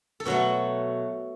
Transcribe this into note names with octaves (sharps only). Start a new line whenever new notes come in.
A4
B2 F#3 A3 F#4